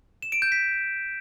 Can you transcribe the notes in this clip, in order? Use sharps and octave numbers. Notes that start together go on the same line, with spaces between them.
E7
D7
G6
B6